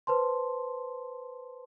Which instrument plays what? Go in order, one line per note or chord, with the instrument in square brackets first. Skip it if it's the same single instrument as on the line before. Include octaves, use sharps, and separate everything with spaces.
[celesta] B4 C5 A5 C6